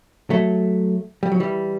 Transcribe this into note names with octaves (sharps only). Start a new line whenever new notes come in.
F#3 A3
G3
F#3
E3 G3